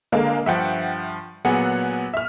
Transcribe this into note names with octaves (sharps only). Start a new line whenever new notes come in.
D3 G#3 A#3
G2 F3 E5 F#5 G5
A#2 F#3 B3 G#4 F#5
E5 F6